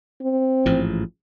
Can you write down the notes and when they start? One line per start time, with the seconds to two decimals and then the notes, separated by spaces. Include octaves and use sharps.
0.21 C4
0.66 A1 G#2 F3